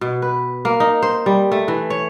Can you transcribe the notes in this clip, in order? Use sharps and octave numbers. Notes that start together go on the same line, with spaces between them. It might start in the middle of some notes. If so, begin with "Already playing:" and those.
B2
B4
A#3
D#4
C5
G3
A3
E3
C#5